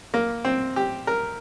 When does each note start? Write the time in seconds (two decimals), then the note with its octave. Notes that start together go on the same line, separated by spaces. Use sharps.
0.14 A#3
0.45 C4
0.76 G4
1.07 A#4